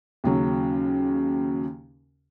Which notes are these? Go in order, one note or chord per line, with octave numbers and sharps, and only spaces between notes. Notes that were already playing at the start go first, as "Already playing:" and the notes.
D#2 C#3 F#3